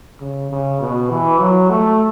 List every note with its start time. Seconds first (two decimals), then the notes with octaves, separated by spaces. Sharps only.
0.20 C#3
0.50 C#3
0.81 B2
1.10 E3
1.40 F#3
1.70 A3